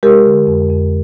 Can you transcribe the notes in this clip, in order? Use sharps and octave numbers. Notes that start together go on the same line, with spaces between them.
G#3 G4 A#4
D3
F2
F2